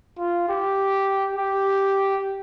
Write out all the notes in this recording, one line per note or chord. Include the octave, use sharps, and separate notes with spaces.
F4
G4
G4